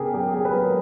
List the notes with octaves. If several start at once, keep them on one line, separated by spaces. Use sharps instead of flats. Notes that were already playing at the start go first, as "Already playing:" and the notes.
Already playing: C#3 G4 G#4 A#4
F#3 G4
G#4
B4
F#3 A#4